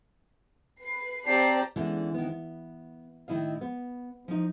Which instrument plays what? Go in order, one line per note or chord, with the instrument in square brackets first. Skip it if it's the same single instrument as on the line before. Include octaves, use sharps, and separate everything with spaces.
[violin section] B4 C7
[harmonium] C4 D5 A5 [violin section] G4 C5 A#5 [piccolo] C7
[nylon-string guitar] D3 E3 G#3 B3 C#4 D4
D#3 B3
B3
A2 D#3 E4 D#5 F5
B3
F3 D#4